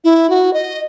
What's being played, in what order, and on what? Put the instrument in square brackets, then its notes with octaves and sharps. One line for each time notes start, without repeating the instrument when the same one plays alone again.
[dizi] E4
F#4
D#5